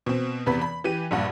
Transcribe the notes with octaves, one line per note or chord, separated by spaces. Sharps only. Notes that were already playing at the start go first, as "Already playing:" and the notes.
B2 C4
E2 C3 B3 B5
B5
E3 G4 D#7
A#1 G2 F#5